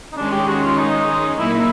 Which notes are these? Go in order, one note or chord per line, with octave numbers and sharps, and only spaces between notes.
D#4
D#3 G#3 C#4 D4
G4
F#4
F4
D#4
A#2 F#3 A#3 D#4 E4
E4